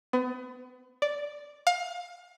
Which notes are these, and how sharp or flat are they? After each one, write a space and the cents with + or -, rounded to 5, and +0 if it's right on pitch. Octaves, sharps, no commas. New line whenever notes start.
B3 +35
D5 -5
F5 +30